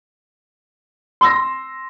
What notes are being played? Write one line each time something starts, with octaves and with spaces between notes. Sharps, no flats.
C6 E6 A#6